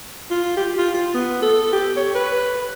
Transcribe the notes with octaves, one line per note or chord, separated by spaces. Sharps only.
F4
G4
F4
F4
B3
A4
G4
C#5
B4